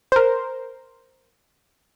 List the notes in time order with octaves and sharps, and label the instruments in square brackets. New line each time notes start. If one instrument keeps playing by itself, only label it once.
[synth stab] A#4 C5